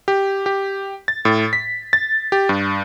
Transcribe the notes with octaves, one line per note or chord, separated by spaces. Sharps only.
G4
G4
A6
A2
B6
A6
G4
G2